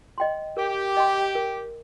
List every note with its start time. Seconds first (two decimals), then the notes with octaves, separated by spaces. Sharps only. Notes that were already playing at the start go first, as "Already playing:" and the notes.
0.18 D#5 G5 C6
0.57 G4 A#4
0.97 D#5 G5 C6
1.35 A#4